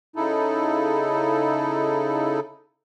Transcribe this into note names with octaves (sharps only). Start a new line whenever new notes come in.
C#3 D#4 E4 A4